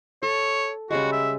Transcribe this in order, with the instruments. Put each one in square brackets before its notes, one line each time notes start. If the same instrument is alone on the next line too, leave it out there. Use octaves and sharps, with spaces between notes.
[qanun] A4 [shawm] C#5
[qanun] C#3 G3 G#3 [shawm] F#4
[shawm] E5